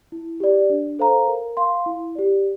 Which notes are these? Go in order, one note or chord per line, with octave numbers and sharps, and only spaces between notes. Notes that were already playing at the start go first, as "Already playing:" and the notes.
E4
G4 D5
D4
A4 C5 F5 A#5
A#4
F5 C6
E4
G4 D5